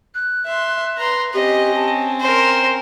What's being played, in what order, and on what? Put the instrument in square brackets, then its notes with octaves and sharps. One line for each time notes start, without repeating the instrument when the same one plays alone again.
[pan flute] F#6
[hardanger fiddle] E5 C6
[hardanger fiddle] B4 [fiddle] A#5 C6
[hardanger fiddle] C4 C#4 [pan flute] G4 [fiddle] D#5
[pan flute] A5
[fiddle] A#4 C5 [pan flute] C6